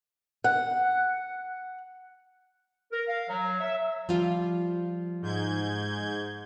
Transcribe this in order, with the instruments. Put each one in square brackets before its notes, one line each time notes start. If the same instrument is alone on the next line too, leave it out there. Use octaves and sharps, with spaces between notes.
[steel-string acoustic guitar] F#5
[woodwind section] A#4
F5
F#3
E5
[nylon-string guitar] F3 G3 F4
[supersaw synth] G#2 G6 G#6